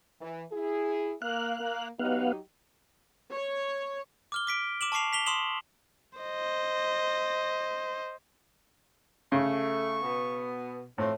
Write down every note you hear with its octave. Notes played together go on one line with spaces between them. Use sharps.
E3
E4 G#4
A#3 F5 F#6
A#3
F#3 B3 D#4 G4 F5 F#5
C#5
D6 F6 G7
D6 B6 D7
D6 E7 F#7
A5 C#6 D6 C7 F7
B6 F7 G7
C6 D#6 E7 F#7 G7
C5 D#5
C#3 A3 C#6
B2 B3
A2 F3 A3 C4